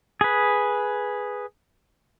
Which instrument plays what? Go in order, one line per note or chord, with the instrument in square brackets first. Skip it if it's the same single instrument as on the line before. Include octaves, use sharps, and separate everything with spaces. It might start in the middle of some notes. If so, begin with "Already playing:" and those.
[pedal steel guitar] G#4 B4